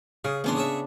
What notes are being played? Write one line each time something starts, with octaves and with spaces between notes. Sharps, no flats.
C#3 G#4
A1 A#3 B3 C#4 D4 C6
G#4 C#5 E5